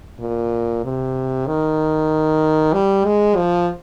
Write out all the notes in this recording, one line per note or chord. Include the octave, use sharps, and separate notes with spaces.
A#2
C3
D#3
G3
G#3
F3